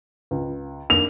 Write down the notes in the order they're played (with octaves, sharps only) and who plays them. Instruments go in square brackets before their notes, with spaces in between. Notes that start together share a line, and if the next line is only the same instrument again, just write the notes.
[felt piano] C#2
[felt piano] A#3 D4 D#4 [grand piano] F7